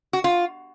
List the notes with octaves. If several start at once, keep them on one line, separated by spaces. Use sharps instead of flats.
F#4
F4